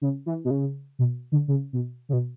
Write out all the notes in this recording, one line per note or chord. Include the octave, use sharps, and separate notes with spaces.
C#3
E3
B2
C#3
B2
D3
C#3
B2
C#3
B2